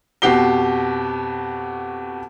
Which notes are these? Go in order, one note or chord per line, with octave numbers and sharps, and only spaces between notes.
F2 B2 F#4 G4 C7 G7